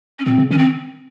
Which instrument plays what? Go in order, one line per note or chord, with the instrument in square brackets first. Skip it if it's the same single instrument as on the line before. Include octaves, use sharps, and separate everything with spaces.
[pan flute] C#4
[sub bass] A#2 [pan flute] C4
[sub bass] C#3
[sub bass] D#3 [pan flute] C#4
[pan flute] C4